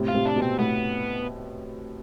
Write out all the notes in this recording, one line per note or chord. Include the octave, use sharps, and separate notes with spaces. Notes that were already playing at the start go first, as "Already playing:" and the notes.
Already playing: A2 C3
F4
A2 C3
D4
B2
C4
A2 B3